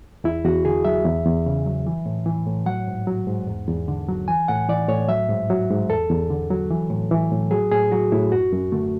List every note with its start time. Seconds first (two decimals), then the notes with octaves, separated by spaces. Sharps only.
0.24 E2 E4
0.45 E2 F#4
0.65 D3 G#4
0.85 F#3 E5
1.05 E2
1.26 E2
1.46 C#3
1.66 F#3
1.87 E3
2.06 A2
2.26 E3
2.47 A2
2.66 F#3 F#5
2.88 G#2
3.07 F#3
3.27 G#2
3.48 E2
3.67 E2
3.88 D3
4.09 F#3
4.28 E3 G#5
4.48 A2 F#5
4.69 E3 D5
4.88 A2 C#5
5.09 F#3 E5
5.29 G#2
5.50 F#3
5.70 G#2
5.90 E2 A4
6.10 E2
6.30 D3
6.51 F#3
6.71 E3
6.90 A2
7.11 E3
7.32 A2
7.51 F#3 G#4
7.71 A2 G#4
7.92 F#3 F#4
8.12 A2 E4
8.32 F#2 F#4
8.53 F#2
8.72 D3 A3